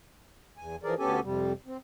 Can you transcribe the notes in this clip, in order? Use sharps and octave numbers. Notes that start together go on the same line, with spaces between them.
E2 G#5
E3 F3 G#4 A#4 D5
D2 B3 C#4 G4 A4 G#5
F2 C3 G3
C4